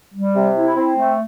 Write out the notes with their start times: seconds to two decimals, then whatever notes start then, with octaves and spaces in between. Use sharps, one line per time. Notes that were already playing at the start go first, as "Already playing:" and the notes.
0.15 G3
0.35 C3
0.56 E4
0.77 C4
0.97 A3